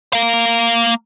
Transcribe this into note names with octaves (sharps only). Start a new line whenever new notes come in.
A#3 F5